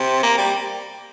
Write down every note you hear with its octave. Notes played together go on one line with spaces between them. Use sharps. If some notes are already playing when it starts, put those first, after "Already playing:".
Already playing: C3
A#3
G3